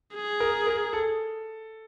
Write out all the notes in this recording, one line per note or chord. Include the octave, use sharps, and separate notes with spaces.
G#4
A#4
A#4
A4